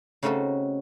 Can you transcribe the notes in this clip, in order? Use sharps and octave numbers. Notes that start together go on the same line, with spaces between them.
C#3 A3 C4 D#4 F#4 A4